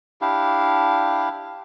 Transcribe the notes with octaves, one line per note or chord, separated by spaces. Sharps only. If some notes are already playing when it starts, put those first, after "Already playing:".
D4 E4 G4 F5